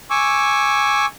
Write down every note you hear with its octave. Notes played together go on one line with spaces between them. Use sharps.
G#5 C#6 D6 E6